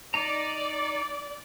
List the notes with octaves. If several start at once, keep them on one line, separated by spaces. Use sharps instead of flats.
D#4 D5 A#5